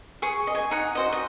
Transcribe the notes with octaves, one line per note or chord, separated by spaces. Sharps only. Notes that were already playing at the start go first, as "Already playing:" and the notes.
G#4 C#6
D#5
G#5
D#4 F#5
F#4 C5 D#5
D#5